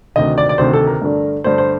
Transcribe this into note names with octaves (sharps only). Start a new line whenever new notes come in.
D2 C3 D#3 D#5
D5
D5
D2 C3 D#3 C5
A4
A#4
G2 D3 A3 D4
G2 D3 A3 D4 C5
C5